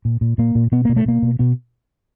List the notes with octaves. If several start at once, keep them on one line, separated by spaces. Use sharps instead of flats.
A#2
A#2
A#2 A#3
A#2
B2 B3
B2 A#3
A3
B2 A#3
B2
B2 B3